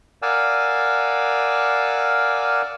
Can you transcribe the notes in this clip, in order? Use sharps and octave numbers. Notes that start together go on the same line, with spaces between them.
A#4 D5 F5 F#5 G#5 E6